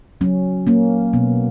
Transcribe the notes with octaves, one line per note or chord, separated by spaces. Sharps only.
F#3 C#4
A#3 C#4
B2 B3